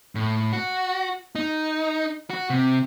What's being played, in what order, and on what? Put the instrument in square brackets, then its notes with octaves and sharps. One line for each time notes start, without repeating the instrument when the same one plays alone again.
[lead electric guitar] A2
F#4
D#4
F#4
C3